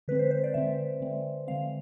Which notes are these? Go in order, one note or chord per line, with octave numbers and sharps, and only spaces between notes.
D3 G#3 C4 B4
C5
C5
D5
D3 G#3 C4 E5
D3 G#3 C4
D3 G#3 C4 F5